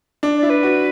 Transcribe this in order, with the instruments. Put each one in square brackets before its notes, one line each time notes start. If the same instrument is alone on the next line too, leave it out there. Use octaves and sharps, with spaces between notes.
[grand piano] D4
[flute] D5
[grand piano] E4
[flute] B4
[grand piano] F#4